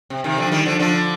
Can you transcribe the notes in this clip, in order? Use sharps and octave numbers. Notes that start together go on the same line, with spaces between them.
C3
C3 D#3
D3 F3
D#3 G3
D3 F3
D3 F3